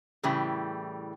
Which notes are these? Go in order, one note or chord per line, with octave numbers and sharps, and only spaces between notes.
A2 C#3 E3 G3